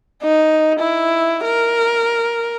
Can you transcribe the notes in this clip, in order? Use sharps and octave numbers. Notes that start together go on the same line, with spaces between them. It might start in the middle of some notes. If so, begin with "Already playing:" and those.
D#4
E4
A#4